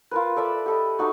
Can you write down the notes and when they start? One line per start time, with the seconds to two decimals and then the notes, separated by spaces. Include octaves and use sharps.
0.11 F4 A#4 B4
0.36 A4 D5 E5 B5
0.66 G4 A4 D#5
0.99 A3 D4 D#4 F#4